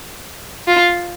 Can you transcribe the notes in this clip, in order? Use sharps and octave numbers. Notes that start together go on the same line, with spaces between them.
F4